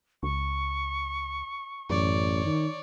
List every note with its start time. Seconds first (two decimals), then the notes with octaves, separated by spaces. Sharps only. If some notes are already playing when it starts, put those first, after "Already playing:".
0.23 C#2 C#6
1.90 A1 F#2 C#5 D5
2.46 D#3